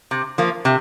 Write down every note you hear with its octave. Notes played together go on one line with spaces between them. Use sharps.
C3
F3 A#3
C3